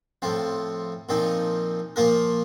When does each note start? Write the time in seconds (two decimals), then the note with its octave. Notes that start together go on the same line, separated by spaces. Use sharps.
0.22 A2 F3 C4
1.09 A#2 F3 C4 D#4
1.96 A#2 F3 A#3 F4 A#4